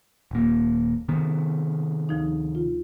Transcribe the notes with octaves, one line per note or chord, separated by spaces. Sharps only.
D#1 A#3
C3 D#3 B3
D2 F3 D#4
F4